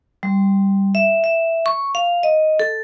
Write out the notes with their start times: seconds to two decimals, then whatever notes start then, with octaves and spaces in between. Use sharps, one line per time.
0.23 G3
0.95 E5
1.24 E5
1.66 C#6
1.95 F5
2.23 D#5
2.60 A4